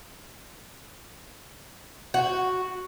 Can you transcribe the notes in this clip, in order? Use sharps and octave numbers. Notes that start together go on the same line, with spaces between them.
F#4